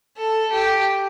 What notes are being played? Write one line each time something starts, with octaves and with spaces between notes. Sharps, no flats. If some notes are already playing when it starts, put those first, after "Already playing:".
A4
G4